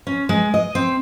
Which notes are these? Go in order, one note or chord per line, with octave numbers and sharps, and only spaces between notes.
C#4
G#3
D#5
C4